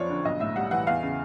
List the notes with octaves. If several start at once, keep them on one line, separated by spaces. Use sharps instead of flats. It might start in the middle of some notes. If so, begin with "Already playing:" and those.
Already playing: F#1 F2 F3 C#5 D5
D3
B1 D#5
A2 E5
G3 F#5
E3 F#5
E2 F5
C#3